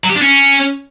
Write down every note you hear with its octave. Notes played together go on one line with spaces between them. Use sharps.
F#3
G4
D4
C#4